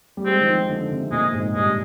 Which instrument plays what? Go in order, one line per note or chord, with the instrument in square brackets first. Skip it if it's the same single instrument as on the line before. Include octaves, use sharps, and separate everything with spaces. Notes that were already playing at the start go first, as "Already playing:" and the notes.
[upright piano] G3
[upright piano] G#3 [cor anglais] C4
[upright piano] D#3
F3
D3
C3
[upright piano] A#2 [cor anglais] G#3
[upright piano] G#2
[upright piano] G2 [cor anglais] G#3